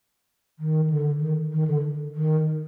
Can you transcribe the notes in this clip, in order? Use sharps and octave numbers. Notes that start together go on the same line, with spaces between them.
D#3
D3
D#3
D#3
D3
D#3